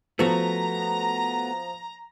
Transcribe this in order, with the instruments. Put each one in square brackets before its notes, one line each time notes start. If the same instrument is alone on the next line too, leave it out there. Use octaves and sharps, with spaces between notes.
[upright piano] F3 [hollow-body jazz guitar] A3 B3 F#4 [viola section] A#5